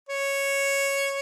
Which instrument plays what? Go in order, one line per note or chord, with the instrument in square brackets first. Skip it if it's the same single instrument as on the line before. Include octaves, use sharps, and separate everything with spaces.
[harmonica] C#5